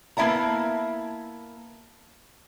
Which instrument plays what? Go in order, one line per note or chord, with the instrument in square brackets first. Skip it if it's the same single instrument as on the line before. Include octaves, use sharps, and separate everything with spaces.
[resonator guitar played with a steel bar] A#3 B3 E4 E5 A5 A#5